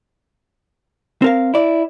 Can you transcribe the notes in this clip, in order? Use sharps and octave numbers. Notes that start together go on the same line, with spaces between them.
C4 A#4 F5
E4 D5